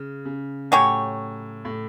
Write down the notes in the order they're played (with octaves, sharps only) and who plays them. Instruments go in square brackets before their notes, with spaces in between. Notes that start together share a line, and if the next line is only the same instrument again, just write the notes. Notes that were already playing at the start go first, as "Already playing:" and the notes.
Already playing: [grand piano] C#3
C#3
[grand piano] A2 [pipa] F#3 C#4 G4 C#5
[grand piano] A2